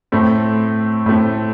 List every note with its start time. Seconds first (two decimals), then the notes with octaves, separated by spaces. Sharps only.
0.12 A2 A3 C4
1.06 A2 A3 C4